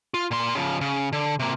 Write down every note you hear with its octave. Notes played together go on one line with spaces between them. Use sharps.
F4
A#2 C6
C#3 F3
C#3
D3
C3 A#3